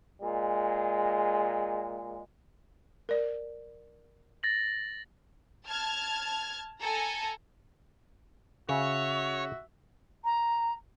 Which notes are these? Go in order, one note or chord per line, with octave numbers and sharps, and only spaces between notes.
A#2 G#3
A#4 D5
A6 A#6 F#7
A5 F6 G#6
A4 G#5 A#5
C#3 F#4 C#5 E5
A#5